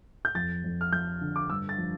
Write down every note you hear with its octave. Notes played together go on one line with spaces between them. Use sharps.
G6
F2 A6
F2
F6
F3 G6
D3
D6
G2 E6
A6
F3